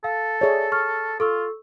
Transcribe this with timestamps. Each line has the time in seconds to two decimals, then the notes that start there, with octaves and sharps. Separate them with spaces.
0.04 A4 F5
0.41 G#4 C#5 D5 E5
0.72 C#6 F6
1.20 F4 A4 C#6 E6